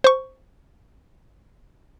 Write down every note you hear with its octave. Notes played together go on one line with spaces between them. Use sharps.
C5 C#6